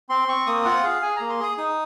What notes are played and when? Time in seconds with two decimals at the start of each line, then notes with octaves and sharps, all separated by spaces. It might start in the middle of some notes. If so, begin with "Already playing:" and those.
0.09 C4 C6
0.28 C4 C#6
0.47 A#3 D#6
0.65 F4 F#5
0.83 G#4 F5
1.02 G#4 G#5
1.16 A#3 A#5
1.30 C6
1.40 G#4 D#6
1.57 D#4 D#6